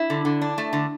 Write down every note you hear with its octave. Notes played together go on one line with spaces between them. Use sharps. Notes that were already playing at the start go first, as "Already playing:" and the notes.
Already playing: E4
D3
D3
D4
A3
D3